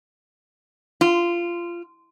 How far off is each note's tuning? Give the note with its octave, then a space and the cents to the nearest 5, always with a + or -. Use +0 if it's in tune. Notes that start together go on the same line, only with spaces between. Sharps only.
F4 -20